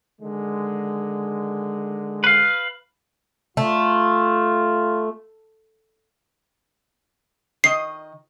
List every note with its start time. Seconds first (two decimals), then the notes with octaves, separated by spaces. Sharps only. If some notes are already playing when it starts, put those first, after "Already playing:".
0.20 D3 D#3 G#3
2.24 B4 F5
3.57 A3 F4
7.64 D#3 D#5 C7